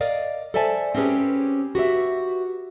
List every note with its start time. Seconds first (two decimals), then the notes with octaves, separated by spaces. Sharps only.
0.01 A#4 D5 D#5 F5
0.54 A4 C5 D5 E5 G#5 A5
0.95 C4 C#4 G4 G#4 B4
1.75 F#4 G4 B4 E5